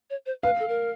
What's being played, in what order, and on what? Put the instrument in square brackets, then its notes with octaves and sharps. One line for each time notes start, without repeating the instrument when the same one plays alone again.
[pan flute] C#5
C5
[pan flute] B4 [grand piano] F5
[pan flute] A4
A#4